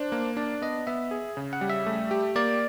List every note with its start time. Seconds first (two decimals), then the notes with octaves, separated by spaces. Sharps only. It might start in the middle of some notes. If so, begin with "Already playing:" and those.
Already playing: D4 C5
0.12 A#3
0.37 D4 D5
0.62 B3 D#5
0.87 B3 E5
1.11 G#4
1.37 C#3
1.53 F#5
1.61 G3
1.70 E5
1.86 A3
2.11 G4
2.36 A#3 D5